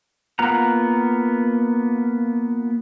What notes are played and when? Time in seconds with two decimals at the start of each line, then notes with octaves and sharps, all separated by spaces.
0.39 A#3 B3 F4 F#5 A#5